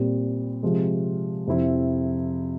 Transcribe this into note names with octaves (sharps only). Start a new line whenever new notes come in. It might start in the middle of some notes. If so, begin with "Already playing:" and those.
Already playing: A#2 G3 C4
C3 F3 G#3
F2 C3 F3 C4 E4